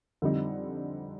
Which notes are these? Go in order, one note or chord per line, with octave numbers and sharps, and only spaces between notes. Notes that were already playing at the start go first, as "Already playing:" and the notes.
F2 D3 G3 C4 D#4